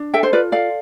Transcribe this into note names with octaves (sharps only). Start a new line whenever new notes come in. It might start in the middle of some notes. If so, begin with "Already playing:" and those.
Already playing: D4
A4 E5 G5
C5
F4 B4 D5
A4 D5 F5